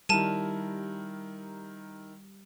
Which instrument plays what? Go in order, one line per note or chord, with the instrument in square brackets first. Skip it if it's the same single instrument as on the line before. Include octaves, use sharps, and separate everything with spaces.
[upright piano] D#3 E4 A#4 [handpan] G3 [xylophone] A5 D#7